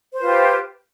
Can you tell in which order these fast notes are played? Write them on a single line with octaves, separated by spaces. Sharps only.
C5 B4 F4 G4